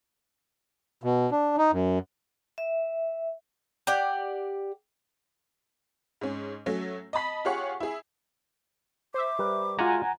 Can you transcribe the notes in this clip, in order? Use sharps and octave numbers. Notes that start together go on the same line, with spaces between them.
B2
D4
D#4
F#2
E5
G4 D5 F#5
G#2 C#4
F#3 A3 C#4
D#5 A5 B5 B6
F4 G4 G#4 C#5 F#5 C#6
E4 G#4
C5 E5 D6
G3 A#4 B4
G#3 F4 F#4 F#5 G#5 A#5